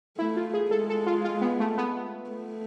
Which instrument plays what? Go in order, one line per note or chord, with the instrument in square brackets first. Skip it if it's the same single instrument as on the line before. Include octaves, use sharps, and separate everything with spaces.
[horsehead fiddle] A3 [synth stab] E4
[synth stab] F4
G#4
[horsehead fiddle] G#3 [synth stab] A4
[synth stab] A4
F4
F4
B3
A3
B3
[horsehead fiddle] A3